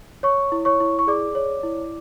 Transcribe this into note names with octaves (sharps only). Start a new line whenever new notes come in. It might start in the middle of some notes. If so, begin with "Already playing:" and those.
C#5 C#6
E4
C#5 C#6
E4
C#6
G#4 D5 D6
C#5
E4